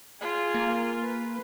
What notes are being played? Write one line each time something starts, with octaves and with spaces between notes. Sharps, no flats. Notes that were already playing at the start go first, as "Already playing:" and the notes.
F4 G#4
A#3
B4